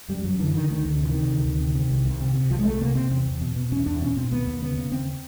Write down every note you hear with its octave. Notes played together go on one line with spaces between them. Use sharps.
F#2 G3
F#2 F#3
D3 E3
D3 D#3
D2 D#3
D2 D3
C3 E3
D#3
C3
D2
D2
C3
C3
C2
C2
C3
C3
C2 F3
G#3
C2 A3
C3 A#3
C3 C4
E2 C4
E2
B2
B2
E2 C#4
E2 D4
B2 C#4
B2 C4
D#2 B3
D#2
C#3 B3
C#3
D#2 C4